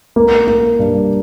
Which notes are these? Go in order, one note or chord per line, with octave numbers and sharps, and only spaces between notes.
A#3
A#3
G2